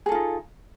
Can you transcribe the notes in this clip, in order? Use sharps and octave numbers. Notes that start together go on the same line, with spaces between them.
D#4 F4 G#4 A4